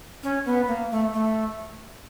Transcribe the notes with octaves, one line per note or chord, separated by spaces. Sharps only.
C#4
B3
A#3
A3
A3